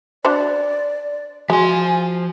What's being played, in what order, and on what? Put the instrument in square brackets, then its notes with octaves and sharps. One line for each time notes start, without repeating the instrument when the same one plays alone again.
[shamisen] D4 F#4 C5 [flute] D5
[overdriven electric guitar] F3 C6 [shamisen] G#3 [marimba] F#4 [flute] G#5